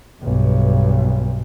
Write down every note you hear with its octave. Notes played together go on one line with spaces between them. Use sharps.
B1 G2